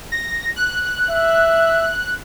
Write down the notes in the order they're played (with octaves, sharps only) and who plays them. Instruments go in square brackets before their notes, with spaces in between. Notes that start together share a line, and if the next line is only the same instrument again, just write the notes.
[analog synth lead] A#6
F#6
[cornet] E5